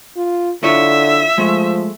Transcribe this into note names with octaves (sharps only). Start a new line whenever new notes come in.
F4
D3 E4 F4 C#5 E5
F3 G#3 A3